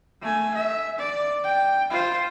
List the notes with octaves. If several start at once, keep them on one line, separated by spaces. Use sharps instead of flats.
A3 G#5
E5
D5
G5
F4 C5